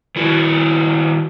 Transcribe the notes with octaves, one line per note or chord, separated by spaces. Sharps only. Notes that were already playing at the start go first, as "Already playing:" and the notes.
D#3 E4 F#4